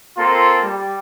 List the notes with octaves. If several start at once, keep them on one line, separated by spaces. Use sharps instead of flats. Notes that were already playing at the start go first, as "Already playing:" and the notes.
A#3 C4 F4 A4
G3